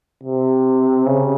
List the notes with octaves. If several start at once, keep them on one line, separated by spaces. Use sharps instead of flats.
C3
C#3